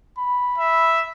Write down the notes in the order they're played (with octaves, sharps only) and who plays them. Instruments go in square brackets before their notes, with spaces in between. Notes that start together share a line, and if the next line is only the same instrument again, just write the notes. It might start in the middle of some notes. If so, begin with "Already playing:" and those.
[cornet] B5
[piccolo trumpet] E5